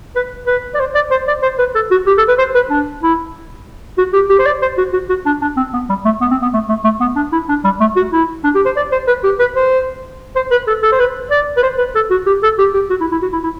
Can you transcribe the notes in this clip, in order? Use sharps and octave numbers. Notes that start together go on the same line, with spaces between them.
B4
B4
D5
C5
D5
C5
D5
C5
B4
A4
F#4
G4
A4
B4
C5
B4
D4
E4
F#4
G4
G4
C5
D5
C5
F#4
F#4
F#4
D4
D4
C4
B3
G3
A3
B3
C4
B3
A3
A3
A3
B3
D4
E4
D4
G3
A3
F#4
E4
D4
G4
C5
D5
C5
B4
G4
B4
C5
C5
B4
A4
A4
C5
B4
D5
B4
C5
B4
A4
F#4
G4
A4
G4
G4
F#4
E4
E4
F#4
E4
E4